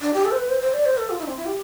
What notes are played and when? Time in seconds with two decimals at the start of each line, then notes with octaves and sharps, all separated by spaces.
0.01 D4
0.13 G4
0.25 A4
0.32 C5
0.37 B4
0.49 C5
0.61 C5
0.74 D5
0.85 C5
0.97 A4
1.10 F4
1.19 E4
1.23 D4
1.27 C4
1.37 E4
1.46 G4